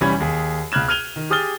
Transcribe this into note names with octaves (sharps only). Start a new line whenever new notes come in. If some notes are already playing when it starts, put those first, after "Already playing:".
F1 E3 G3 C#4 B5 G#6
D#2 G#4
C#2 F6 F#6 G#6 E7
F6 G#6 D#7 F7 G7
D#3
G4 G#4 D#6 F6 A6 G7